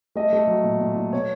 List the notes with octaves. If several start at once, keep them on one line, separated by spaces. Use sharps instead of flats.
A3 D#5
A3
F#3
A#2
A#2
A#2
B2 C#5